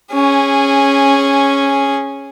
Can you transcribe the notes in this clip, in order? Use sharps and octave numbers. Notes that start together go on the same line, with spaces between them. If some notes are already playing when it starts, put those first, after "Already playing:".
C#4 G#4